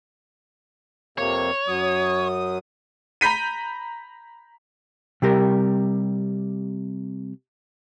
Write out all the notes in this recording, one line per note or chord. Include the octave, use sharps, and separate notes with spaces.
F2 C3 A#3 C#5
F#2 F#3 D#6
A#5 B5 G6 B6 D#7
C3 G3 G4 A#4